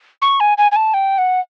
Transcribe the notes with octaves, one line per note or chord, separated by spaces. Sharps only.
C#6
G#5
G#5
G#5
A5
G5
F#5